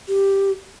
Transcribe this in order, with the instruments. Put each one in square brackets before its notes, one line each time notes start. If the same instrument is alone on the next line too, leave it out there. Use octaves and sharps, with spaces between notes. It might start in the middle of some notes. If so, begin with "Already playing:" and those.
[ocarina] G4